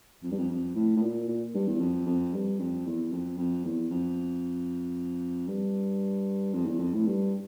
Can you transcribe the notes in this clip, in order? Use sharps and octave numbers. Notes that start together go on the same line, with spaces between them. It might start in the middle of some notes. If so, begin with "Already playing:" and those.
F2
G2
F2
F2
A2
A2
A#2
A#2
G2
E2
F2
F2
G2
F2
E2
F2
F2
E2
F2
G2
F2
E2
F2
A2
G2